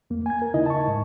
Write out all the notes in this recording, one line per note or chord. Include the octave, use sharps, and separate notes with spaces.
E2 A#3
G#5 G#6
A#4
D#2 C#3 D#4 E4 D#5
A5 C#6
G#2